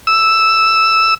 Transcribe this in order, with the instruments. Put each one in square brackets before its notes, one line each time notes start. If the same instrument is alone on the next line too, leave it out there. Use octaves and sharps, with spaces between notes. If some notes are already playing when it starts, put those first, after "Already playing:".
[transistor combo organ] E6